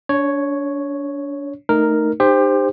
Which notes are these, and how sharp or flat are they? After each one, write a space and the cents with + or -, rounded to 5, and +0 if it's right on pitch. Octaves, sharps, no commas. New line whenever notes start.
D4 -35 C#5 +0
A3 +0 D#4 -15 A#4 +0
D#4 -40 G4 +25 C5 +0